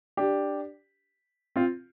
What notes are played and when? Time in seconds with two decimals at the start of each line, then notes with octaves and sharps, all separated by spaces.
0.17 D4 G4
1.56 C4 F4